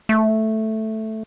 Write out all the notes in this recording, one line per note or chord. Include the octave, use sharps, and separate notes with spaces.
A3